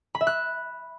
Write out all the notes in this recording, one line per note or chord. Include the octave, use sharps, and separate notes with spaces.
B5
E5
F#6